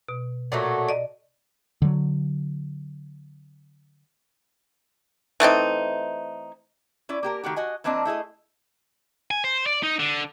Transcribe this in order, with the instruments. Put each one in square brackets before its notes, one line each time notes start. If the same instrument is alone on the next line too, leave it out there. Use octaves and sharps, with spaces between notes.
[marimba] B2
[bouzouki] A#2 F#3 A3
[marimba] D5 D#5
[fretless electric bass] D3 F#3
[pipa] E3 A3 C4 D#4
[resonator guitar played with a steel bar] C#4 E4 D5
A#3 G4 A#4
D#3 A3 F#4 G4
F#4 D#5 G#5
E3 A#3 C4 D4 D#5
A3 E4 G#4 D#5
[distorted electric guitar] G#5
C5
D5
D#4
D3